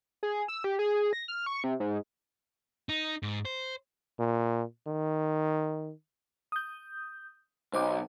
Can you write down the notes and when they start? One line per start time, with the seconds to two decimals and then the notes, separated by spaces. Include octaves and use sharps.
0.23 G#4
0.48 E6
0.64 G4
0.79 G#4
1.13 A#6
1.28 F6
1.46 C#6
1.64 C3
1.80 G#2
2.89 D#4
3.23 G#2
3.45 C5
4.19 A#2
4.87 D#3
6.52 D#6 G6
7.74 B1 C5 D#5 D6